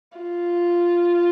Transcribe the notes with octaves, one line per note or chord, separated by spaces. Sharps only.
F4